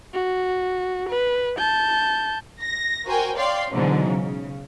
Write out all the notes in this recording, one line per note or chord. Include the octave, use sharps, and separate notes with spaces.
F#4
B4
A5 G6
A#6
F#4 A#4 C5 G5 G#5
C#5 D5 F5 G5 C6
G#2 B2 D3 E3 F#3
C#3